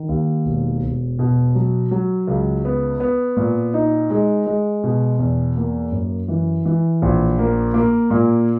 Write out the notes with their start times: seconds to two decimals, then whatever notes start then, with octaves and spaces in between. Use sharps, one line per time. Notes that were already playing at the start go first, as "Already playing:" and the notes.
Already playing: D#3
0.09 D#2
0.45 E1
0.82 E1
1.19 B2
1.55 F#3
1.91 F#3
2.27 C#2
2.65 B3
3.00 B3
3.37 A#2
3.74 D#4
4.10 G#3
4.46 G#3
4.84 B2
5.19 E2
5.56 A#3
5.92 F#2
6.28 E3
6.66 E3
7.02 A#1
7.39 A#3
7.74 A#3
8.10 A#2